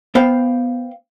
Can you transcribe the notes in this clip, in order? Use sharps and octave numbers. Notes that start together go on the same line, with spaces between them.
B3 C5 F5 G5